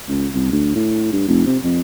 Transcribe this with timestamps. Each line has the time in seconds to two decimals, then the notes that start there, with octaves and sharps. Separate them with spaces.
0.08 C#2
0.34 C2
0.52 D2
0.75 A2
1.12 G2
1.28 F1
1.46 C3
1.63 F2